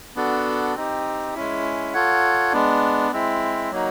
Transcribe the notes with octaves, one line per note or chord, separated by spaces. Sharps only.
B3 D4 F#4 A4
C4 D#4 G4
G#3 C#4 E4
F4 A4 C#5 F#5
G#3 B3 D4
G#3 C4 E4
F#3 A#3 D#4 F#4